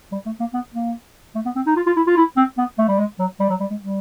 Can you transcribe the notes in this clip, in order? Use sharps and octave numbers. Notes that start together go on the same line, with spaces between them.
G3
A3
A#3
B3
A#3
A3
B3
C4
D#4
F4
F4
E4
F4
E4
C4
B3
A3
G3
G#3
F#3
G3
F#3
G3
G#3
G3